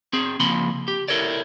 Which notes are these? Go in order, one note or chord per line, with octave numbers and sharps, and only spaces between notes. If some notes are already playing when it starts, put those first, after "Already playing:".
C4 G#4
C#3 F3 A#3 B5 C6
G4
E4 A4 A#4 C#5 D5